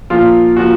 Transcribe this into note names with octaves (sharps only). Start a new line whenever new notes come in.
A#2 F3 F4
A#2 F3 F#4